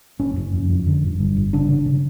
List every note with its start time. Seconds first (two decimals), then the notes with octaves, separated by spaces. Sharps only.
0.19 F#1 C#4
0.36 F#1
0.53 F2
0.69 F2
0.87 D3
1.03 G1
1.19 G2
1.36 G1
1.53 C#3 D4
1.69 C#3
1.86 C#3